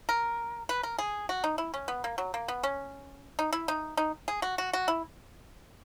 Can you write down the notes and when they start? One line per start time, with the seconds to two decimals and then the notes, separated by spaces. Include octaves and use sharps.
0.09 A#4
0.69 B4
0.83 A#4
0.98 G#4
1.29 F#4
1.44 D#4
1.58 E4
1.74 C#4
1.88 B3
2.04 A#3
2.18 F#3
2.34 A#3
2.48 B3
2.63 C#4
3.39 D#4
3.53 E4
3.68 D#4
3.97 D#4
4.28 G#4
4.42 F#4
4.58 F#4
4.73 F#4
4.88 E4